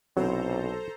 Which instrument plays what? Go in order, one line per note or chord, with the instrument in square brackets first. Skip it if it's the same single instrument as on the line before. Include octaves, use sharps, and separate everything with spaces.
[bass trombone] B1 [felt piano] C3 E4 [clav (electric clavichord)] F#3 [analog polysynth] A4 C5 A#5